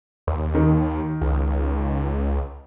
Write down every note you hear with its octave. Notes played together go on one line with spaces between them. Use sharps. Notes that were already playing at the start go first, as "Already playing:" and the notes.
D#2
D#3
C#2